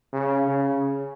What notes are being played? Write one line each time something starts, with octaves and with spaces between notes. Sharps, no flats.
C#3
C#3